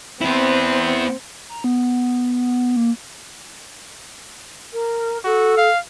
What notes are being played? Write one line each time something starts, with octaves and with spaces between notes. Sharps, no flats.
B3 C4 E4
A#5
B3
A#3
A#4
F#4 A4
F5